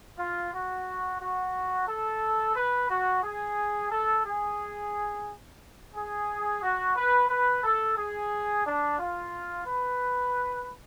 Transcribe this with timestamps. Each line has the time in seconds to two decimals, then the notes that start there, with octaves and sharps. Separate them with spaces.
0.18 F4
0.52 F#4
1.20 F#4
1.88 A4
2.56 B4
2.89 F#4
3.23 G#4
3.91 A4
4.25 G#4
5.94 G#4
6.62 F#4
6.96 B4
7.29 B4
7.64 A4
7.96 G#4
8.65 D4
8.98 F4
9.66 B4